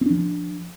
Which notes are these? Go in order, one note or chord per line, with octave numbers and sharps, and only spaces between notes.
F3 C4 D4